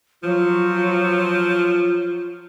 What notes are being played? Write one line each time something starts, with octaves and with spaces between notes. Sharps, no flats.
F3 F#3 F4